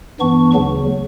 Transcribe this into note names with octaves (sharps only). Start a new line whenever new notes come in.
G2 E3 B3 D4 C#6
D2 C#3 F#3